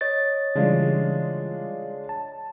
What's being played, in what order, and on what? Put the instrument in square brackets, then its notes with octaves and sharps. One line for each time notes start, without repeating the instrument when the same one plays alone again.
[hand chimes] C#5 D#5 A6
[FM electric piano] C#3 E3 G3 [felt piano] G#3 D4 F4
[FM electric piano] A5